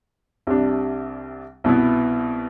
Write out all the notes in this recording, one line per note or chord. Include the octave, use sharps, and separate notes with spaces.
C2 C3 G3 D4
C2 B2 B3 E4